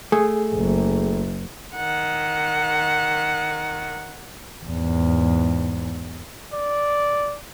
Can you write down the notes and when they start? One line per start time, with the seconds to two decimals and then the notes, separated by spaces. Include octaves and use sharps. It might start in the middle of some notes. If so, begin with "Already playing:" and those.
0.12 A3 G#4
0.55 F#1
1.75 D#3 F#5
4.65 E2 G#2
6.53 D5